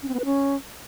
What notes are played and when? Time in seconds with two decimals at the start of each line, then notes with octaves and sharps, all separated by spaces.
0.03 C#4
0.08 C4
0.14 B3
0.19 B4
0.25 C#4